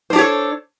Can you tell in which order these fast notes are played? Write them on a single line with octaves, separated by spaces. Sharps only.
C5 D4 G4 C#5 A4